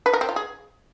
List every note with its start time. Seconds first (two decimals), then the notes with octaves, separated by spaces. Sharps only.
0.06 B4
0.13 A#4
0.21 C4
0.29 F4
0.36 G#4